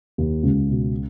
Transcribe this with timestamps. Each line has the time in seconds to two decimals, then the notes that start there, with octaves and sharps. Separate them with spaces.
0.18 D#2
0.43 C#2
0.69 B2